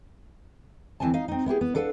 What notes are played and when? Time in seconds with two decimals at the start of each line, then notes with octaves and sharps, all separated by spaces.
1.00 D2 E3 C4 G#5 A5
1.14 D#4 F5
1.28 C4 D#4
1.46 B3 E4 G4 G#4
1.61 B3
1.75 D4 A4 B4 F5 F#5